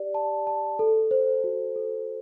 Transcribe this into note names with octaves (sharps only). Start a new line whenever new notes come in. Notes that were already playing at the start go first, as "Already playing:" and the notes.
Already playing: G4 D5
A5
A5
A4
C5
F#4
A4